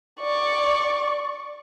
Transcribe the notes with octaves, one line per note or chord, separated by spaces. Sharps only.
D5 C#6